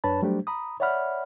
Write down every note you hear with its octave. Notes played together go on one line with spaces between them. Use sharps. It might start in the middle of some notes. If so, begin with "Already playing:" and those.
F#2 D4 B4 C#5 A5 B5
F#3 G3 A3 D4 G4 C5
A#5 B5 D#6
C#5 D5 E5 F#5 B5 F6